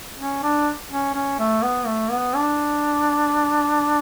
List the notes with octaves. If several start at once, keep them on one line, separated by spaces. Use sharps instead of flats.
C#4
D4
C#4
C#4
A3
B3
A3
B3
D4